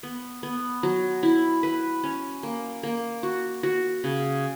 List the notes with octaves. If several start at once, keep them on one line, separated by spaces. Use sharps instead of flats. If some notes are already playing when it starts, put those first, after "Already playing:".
B3
B3
F#3
E4
B4
C#4
A#3
A#3
F#4
F#4
C#3